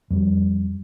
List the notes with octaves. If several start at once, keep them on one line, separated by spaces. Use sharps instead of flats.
F2 G3